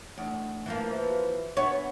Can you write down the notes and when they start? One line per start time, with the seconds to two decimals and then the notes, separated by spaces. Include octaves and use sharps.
0.18 E2 A3 D4
0.66 E3 F3 A#3
0.91 B4 C5 E5
1.10 F#4
1.57 B3 D4 C#5 E5 C#6